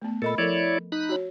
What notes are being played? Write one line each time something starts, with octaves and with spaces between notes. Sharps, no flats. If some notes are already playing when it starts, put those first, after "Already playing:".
A3 B3
A#2 A4 A#4 D#5 B5
F3 E4 A4 A#4 C#5 D5
D#4 B5 F#6
F#4 C#5